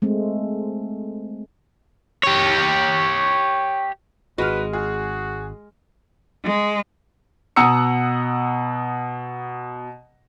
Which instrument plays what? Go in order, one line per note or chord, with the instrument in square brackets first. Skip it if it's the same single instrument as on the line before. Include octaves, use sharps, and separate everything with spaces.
[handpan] G#3 A3 C4
[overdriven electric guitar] G4 C#5
[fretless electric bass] G#1 [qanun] G#3 [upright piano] F#4 F6 [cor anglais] B4
[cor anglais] F#4 [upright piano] G#4
[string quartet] G#3
[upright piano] B2 F#5 A#5 D#6 E6 C#7